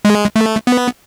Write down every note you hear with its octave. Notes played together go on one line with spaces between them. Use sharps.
G#3
A3
B3